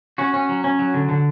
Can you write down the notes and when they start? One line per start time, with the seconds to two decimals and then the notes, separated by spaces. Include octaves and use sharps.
0.18 C#4 F#4
0.34 C#4
0.49 F#3
0.64 C#4
0.79 F#3
0.94 D3
1.09 D3